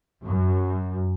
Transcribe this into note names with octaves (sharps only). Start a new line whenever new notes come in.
F#2